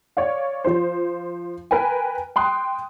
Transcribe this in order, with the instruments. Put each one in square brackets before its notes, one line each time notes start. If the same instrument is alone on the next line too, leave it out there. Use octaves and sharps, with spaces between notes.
[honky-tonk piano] C#5 D5 F5
F3 F4 C5
A#4 B4 G5 G#5
G5 C6 D#6 F#6